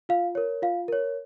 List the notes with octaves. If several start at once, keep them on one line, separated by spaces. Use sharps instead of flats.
F4 F5
A#4 C#5
F4 F5
A#4 C#5